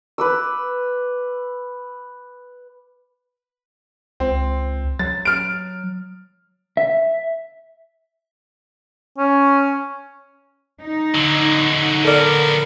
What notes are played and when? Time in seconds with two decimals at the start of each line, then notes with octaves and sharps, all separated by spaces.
0.18 B4 D6 E6
4.20 C#2 C4
4.99 F#3 A6
5.25 F6 D7
6.77 E5
9.18 C#4
10.80 D#4
11.15 D3 F#3
12.05 B3 A4 A#4 D5